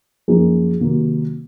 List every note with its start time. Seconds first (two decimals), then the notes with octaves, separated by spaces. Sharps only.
0.28 F#2 F3 A#3 D#4 G#4
0.79 C3 D#3 F#3 A#3